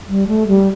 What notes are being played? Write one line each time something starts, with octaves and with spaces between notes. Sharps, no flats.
G3
A3
G3